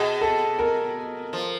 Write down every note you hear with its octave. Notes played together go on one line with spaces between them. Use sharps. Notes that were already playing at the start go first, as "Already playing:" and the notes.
Already playing: B2 G#4
A4
A#4
F3